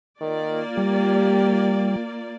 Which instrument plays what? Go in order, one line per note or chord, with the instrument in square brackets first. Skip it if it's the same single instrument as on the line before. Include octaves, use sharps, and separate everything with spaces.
[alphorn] D#3 [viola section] A#3 F4 D5
[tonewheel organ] G3 [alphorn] G4